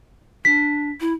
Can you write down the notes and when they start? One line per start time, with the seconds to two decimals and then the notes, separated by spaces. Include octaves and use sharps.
0.45 D4 B6
1.01 E4